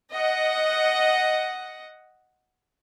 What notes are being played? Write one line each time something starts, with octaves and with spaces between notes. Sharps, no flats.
D#5 F#5